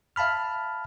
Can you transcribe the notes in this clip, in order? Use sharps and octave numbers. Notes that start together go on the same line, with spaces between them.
E5 F5 A5 B5 F6